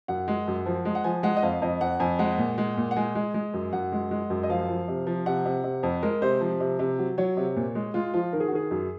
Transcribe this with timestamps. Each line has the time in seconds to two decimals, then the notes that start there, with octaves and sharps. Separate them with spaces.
0.08 F#2 F#5
0.28 G#3
0.48 F#2
0.66 F3
0.85 G#3
0.95 F#5
1.04 F3 G#5
1.23 G#3 F#5
1.37 D#5
1.42 F2 F5
1.62 F2 D#5
1.81 F2 F#5
2.00 F2 G#5
2.19 G#3 F#5
2.38 A#2
2.58 G#3
2.77 A#2
2.91 F#5
2.96 G#3 G#5
3.15 G#3
3.34 G#3
3.54 F#2
3.73 F#2 F#5
3.92 G#3
4.11 G#3
4.30 F#2
4.43 D#5
4.50 F3 F5
4.68 F3
4.88 C3
5.07 F3
5.26 C3 F#5
5.46 C3
5.64 C3
5.83 F2
6.03 G#3 A#4
6.22 C3 C5
6.41 F3
6.60 C3
6.79 C3
6.99 F#3
7.18 F#3 C#5
7.37 C3
7.56 A#2
7.75 G#3
7.94 G#3 F4
8.14 F3 F4
8.33 D#3 A#4
8.40 G#4
8.48 F#4
8.52 D#3 G#4
8.71 F#2